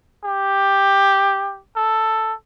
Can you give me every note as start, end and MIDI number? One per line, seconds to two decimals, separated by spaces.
0.24 1.60 67
1.76 2.33 69